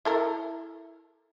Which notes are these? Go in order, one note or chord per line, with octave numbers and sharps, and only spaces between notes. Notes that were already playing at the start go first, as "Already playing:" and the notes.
E4 A4 A#4